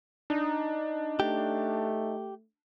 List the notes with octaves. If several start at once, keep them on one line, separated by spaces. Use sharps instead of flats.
D4 D#4
A3 G4